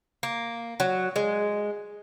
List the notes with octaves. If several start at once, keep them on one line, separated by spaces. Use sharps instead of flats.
A#3
F#3
G#3